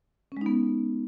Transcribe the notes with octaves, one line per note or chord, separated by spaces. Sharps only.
G#3 B3 C#4 D#4